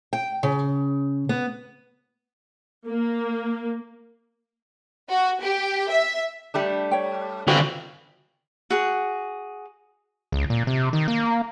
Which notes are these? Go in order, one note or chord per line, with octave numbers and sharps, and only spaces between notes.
G5
C#3
B3
A#3
F#4
G4
E5
G3 A3 D4
C#5 G5
D3 C4 F4 F#4 B4
F#4 G#4
C#2
A#2
C3
D#3
A#3